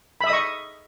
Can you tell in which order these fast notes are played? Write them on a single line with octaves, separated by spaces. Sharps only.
B5 E5 D#6 D#5 C#6